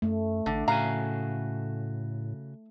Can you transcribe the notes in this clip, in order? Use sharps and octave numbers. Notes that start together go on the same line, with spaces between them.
F#2 A3
A1 D3
A2 C#3 F#4 F5 G#5 A#5